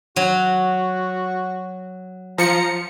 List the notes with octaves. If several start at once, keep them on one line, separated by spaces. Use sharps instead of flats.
F#3 F#4
F3 A#5 C#7